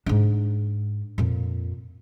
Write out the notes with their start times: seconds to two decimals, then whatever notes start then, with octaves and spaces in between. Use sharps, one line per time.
0.06 G#2 D4
1.18 F2 A#2